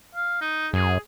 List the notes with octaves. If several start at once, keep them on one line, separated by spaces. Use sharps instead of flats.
F5
D#4
F#2 G#4